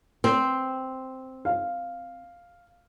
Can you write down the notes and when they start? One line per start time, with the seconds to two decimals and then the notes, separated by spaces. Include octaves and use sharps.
0.24 C4
1.45 F5